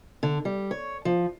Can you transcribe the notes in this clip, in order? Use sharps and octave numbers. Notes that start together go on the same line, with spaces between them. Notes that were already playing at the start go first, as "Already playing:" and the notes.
D3
G3
C#5
F3